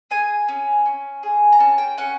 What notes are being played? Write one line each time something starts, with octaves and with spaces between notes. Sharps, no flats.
G#4 G#5
C#4
C#4
G#4
A#5
C#4 A5
G5
C#4 F#5